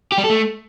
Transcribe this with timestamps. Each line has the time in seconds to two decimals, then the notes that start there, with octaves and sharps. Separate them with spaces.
0.12 G4
0.18 G3
0.24 A4
0.30 A3